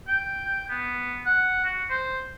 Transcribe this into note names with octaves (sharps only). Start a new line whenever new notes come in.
G5
B3
F#5
F#4
C5